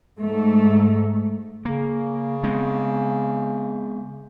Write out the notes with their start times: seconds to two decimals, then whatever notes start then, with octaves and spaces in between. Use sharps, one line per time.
0.20 G#2 A3
1.65 C#3 A#3
2.43 G#3 B3 C4